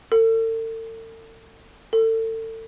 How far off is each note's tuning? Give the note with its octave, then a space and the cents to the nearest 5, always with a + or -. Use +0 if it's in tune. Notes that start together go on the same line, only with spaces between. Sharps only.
A4 +40
A4 +30